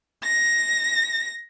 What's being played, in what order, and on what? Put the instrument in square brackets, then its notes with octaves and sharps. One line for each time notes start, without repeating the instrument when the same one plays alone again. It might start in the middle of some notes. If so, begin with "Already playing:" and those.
[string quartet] A#6